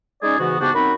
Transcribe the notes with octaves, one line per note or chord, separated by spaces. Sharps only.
G#3 C#4 D#4 G#4 D5
G#2 C#3 E3 B3 F#4
G#2 C#3 B3 D4 F#4 G4
F#2 C4 D#4 F#4 B5